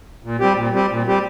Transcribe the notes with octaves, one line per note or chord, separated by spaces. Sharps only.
A#2
G3 C4 G4
A#2
G3 C4 G4
A#2
G3 C4 G4